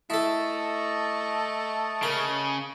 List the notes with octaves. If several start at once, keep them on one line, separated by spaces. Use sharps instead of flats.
A3 E4 A4 D#5 A5 C#6
C#3 A#4